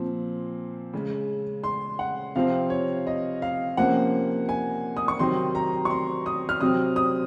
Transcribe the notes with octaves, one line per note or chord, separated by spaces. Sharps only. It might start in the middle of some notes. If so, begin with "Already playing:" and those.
Already playing: A#2 F3 C4
C#3 G#3 C#4
C6
F#5
C3 F3 C4 F5
C#5
D#5
F5
C3 F3 A#3 C#4 F#5
G#5
D#6
C#6
C3 D#3 F#3 C4 C6
A#5
C#6
C6
D#6
F6
C3 F#3 C4 D#6
D#6